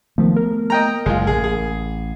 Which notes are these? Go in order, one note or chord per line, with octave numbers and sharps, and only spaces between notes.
D#3 F3 A3 B3
A#4
D#5 G5 A#5
F#1 C#3 G#3 F4
A1 G#4
G#4